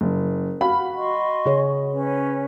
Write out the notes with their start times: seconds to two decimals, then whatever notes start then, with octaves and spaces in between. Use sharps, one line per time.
0.01 F#1
0.61 F#4 F5 B5
0.96 D#5 C6 C#6
1.46 C#3 G#4 C#5
1.90 C#4 B4